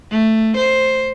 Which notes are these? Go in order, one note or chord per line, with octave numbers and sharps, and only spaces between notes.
A3
C5